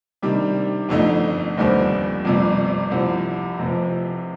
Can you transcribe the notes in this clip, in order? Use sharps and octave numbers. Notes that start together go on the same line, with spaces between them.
C3 D#3 G3 D4
G1 F2 D3 A3 D#4
F1 D#2 D3 G3 C4
G1 F2 C3 G3
C2 C3 F3 C4
F1 F2 C3 F3